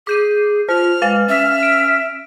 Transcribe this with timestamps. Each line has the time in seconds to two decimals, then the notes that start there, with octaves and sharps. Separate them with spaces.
0.07 G#4 D6 G6 D#7
0.69 F4 C5 F6
1.02 G#3 B4 F5 A6
1.29 C#4 E5 F6
1.63 D7